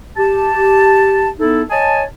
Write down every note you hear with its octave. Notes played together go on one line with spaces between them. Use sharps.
G4 A5
B3 D#4 E4 A4
C#5 D#5 G#5 A5